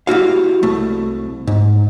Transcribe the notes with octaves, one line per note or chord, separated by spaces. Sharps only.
G3 E4 F#4 F5
C2 A3
G#2